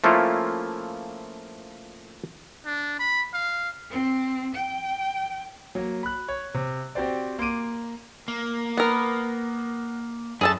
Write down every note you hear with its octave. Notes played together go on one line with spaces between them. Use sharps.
F3 A3 A#3 C#4 E4 F4
D4
B5
F5
C4
G5
F#3 A#3
B5 F#6
C#5
C3
C4 F#4 G4 C5 D5
A#3 C6 D6 D7 D#7
A#3
B3 A#4
F#2 G#4 A4 A5